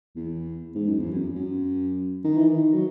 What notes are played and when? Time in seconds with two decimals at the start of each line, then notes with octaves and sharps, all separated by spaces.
0.16 E2
0.75 G#2
0.88 F#2
1.00 E2
1.11 F#2
1.35 F#2
2.24 D#3
2.37 E3
2.47 D#3
2.73 F#3